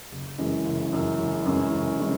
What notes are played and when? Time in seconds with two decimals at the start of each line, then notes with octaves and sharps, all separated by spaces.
0.12 F#1
0.38 F#2 E3 G#3 C#4
0.65 F#1
0.92 F#2 E3 G#3 C#4
1.20 F#1
1.46 F#2 E3 G#3 C#4
1.73 F#1
2.00 E3 G#3 C#4